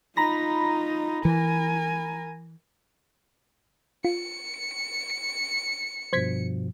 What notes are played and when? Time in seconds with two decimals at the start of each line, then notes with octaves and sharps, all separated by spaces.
0.17 D#4 F4 A#5 B5 A#6
1.25 E3 A#4 G#5
4.05 F4 C#7
6.13 G2 B2 F3 C5 G#6 B6